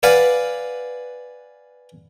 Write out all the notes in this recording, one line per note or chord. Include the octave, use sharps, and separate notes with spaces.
B4 D5 F5 F#5 G#5